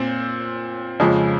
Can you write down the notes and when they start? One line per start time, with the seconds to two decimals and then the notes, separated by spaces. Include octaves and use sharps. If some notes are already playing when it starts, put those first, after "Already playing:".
Already playing: A#2 C4
1.00 F2 C#3 F3 G#3